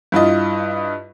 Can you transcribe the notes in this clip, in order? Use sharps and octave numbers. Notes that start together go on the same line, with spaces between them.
G2 E4 F4 D#5